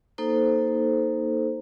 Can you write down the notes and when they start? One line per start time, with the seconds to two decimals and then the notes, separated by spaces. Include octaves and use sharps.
0.18 A#3 D#4 A4 C5